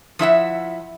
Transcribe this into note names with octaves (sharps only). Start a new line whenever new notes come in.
F3 E4 E5 F#5